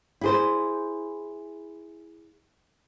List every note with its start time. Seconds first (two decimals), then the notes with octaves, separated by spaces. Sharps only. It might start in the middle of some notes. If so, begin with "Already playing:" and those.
0.21 E4 G#4 C5